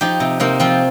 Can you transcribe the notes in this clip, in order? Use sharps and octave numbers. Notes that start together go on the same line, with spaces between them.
F3 D#4 G4
C3
C3 A#3 D#4
F3 C4 F4